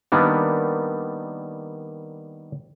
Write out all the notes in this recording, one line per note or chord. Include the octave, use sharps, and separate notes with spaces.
D#3 G3 A#3 B3 D4